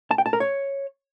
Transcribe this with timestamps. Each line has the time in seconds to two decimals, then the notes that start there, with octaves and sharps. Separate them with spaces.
0.11 A5
0.18 G5
0.26 A5
0.33 A#4
0.40 C#5